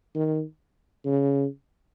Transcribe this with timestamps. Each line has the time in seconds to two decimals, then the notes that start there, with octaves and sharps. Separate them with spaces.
0.15 D#3
1.06 C#3